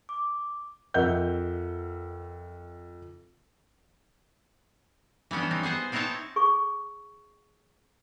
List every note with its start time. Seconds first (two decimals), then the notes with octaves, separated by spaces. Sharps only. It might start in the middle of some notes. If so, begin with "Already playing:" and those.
0.09 D6
0.94 F2 A#4 D#5 E5 F#5 G6
5.31 E3 G3 B3 C#4 D4
5.51 C4 D#4
5.63 B3 G#4 C5 F#5
5.92 B3 C4 D#4 E4 C#5 A5
6.36 G#4 C#6